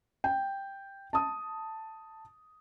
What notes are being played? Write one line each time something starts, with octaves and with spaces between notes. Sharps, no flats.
G5
A5 D#6